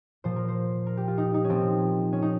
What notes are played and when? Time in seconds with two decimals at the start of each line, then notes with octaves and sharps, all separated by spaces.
0.24 A#2 F3 C5
0.36 A#4
0.48 C5
0.87 A#4
0.97 G4
1.08 F4
1.18 D#4
1.34 D#4
1.44 C#4
1.49 A#2 F3 C4
2.13 C#4
2.22 D#4